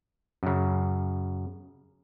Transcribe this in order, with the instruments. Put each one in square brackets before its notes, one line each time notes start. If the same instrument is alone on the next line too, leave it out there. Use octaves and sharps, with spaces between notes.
[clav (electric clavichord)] F#2 C#3